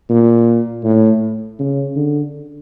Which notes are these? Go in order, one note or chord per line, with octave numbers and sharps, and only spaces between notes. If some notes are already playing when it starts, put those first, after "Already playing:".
A#2
A2
C#3
D3